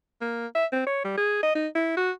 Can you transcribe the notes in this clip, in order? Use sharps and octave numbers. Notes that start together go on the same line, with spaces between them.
A#3
E5
C4
C#5
G3
G#4
D#5
D#4
E4
F#4